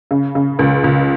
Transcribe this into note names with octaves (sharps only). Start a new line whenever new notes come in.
C#3
C#3
C#2
C#2